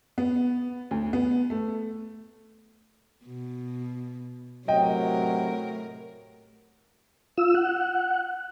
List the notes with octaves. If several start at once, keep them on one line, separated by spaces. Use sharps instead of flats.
B3
D2
B3
A3
B2
A2 C3 F#3 A#4 D#5 G5
F4 E6
F#5